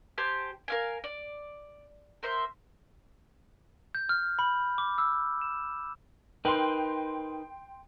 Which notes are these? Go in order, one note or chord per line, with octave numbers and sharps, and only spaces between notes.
G4 C5 G#5 A5
A#4 F5 G#5
D5
A#4 C5 E5
G6
F6
B5
D6
E6
E7
D#4 A#4 B4 G5 C6